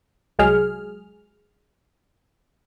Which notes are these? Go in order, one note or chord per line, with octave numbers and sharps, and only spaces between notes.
C2 F#3 G#3 G#4 F6